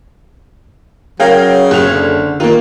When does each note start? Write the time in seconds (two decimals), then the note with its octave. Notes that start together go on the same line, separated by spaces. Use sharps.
1.20 C#3 F#3 A#4 F5 G5
1.71 F#1 F7
1.92 D3
2.40 D#3 A#3 F4